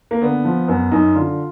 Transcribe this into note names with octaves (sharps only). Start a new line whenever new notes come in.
A#3
D3 B3
F3
F#2 B3
F#2 D#4
D3 F4